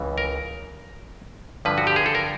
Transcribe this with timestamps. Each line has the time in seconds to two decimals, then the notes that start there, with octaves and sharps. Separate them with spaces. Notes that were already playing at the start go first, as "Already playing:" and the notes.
Already playing: C#2 C#3 E3
0.18 A#4
1.65 G2 D3 F3 B4
1.78 F#4
1.87 G4
1.96 G#4
2.06 A4
2.15 A#4